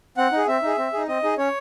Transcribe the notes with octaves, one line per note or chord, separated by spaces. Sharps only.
C4 F#5
D#4 G#4
C4 E5
D#4 G#4
C4
D#4 G#4
C4 D#5
D#4 G#4
C#4 C#5